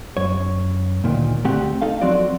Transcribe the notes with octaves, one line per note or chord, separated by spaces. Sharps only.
F#2 C#5
D2 A#2 D#3
D2 A3 C4 G4 F#5
D#4 A4 F5
F3 F#3 C4 F#4 D5